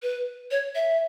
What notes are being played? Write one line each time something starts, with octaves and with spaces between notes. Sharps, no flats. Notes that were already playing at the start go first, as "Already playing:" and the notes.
B4
C#5
E5